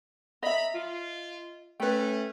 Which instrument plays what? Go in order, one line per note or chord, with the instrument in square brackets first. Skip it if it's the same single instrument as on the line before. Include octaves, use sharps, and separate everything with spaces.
[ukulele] D#5 E5 [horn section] A#5 B5
[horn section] F4
[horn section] A3 C#4 [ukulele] B4 G5